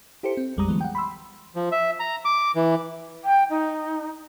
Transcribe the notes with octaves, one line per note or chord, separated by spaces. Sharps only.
E4 G4 A4 C5 C#7
C4
A#1 F2 G3 G#3 A#5 D#6
D3 E3 F#3 G#3 B3
F#5 G5
B5 C6 E6
F3
E5
A#5
D6
E3
G5
D#4